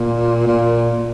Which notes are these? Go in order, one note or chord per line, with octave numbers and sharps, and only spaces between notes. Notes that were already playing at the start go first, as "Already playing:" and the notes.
Already playing: A#2
A#2